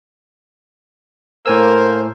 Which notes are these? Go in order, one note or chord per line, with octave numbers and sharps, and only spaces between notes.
A2 A#3 A#4 C5 G#5 E6